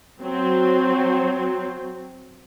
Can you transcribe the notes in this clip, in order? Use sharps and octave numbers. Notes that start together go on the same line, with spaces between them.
F#3 C4